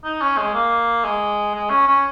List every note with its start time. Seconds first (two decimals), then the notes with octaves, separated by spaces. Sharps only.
0.04 D#4
0.21 C#4
0.38 G#3
0.54 A#3
1.04 G#3
1.54 G#3
1.70 C#4
1.87 C#4